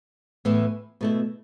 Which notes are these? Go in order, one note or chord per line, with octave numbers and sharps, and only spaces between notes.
A2 E3 B3 E4
B2 A3 E4